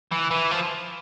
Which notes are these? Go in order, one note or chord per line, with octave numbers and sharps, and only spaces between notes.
E3
E3
F3